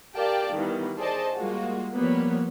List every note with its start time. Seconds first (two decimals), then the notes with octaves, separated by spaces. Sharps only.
0.15 G4 A#4 D5 F5 G5 A5
0.54 D#3 E3 G3 B3
0.98 G#4 A4 C5 D5 D#5 A5
1.36 G3 G#3 A#3 F4 F#4
1.95 F3 G3 A#3 B3 C#5